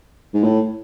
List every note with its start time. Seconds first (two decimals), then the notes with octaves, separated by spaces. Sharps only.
0.34 G#2
0.44 A2